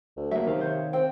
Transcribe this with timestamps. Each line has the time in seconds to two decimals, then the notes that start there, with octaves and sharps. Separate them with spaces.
0.17 D2
0.31 F#3 A#3 E5
0.47 C3 D#3 F5
0.61 C5 C#5
0.93 C4 G5